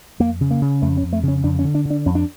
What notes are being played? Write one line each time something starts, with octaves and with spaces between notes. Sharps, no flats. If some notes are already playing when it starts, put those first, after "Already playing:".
F2 A#3
C#3
A#3
C#3
F2 A3
C#4
F2
A3
C#3
C#4
F2 D4
C#4
D3
D4
D3
D4
F2 C#4
D4